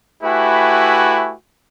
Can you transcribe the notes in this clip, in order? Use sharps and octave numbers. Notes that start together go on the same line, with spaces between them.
A3 E4 F#4 G4 B4 G#5